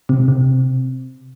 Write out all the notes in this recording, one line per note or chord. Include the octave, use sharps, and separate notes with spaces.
C3
C3